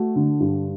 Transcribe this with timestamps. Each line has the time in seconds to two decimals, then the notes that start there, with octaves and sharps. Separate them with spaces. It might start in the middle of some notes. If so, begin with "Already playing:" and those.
Already playing: A3 F#4
0.16 D3
0.40 G2